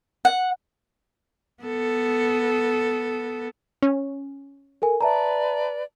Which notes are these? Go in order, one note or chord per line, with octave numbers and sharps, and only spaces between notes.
F#5
B3 A4
C#4
A4 A#4 G#5
B4 D5 E5 A5 A#5